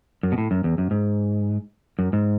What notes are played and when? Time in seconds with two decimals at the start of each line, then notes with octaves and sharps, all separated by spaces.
0.23 F#2
0.32 B2
0.38 A2
0.51 F#2
0.64 E2
0.78 F#2
0.91 G#2
1.99 F#2
2.13 G#2